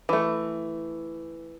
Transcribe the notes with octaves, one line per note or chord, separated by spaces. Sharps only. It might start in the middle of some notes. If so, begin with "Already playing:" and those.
E3 A3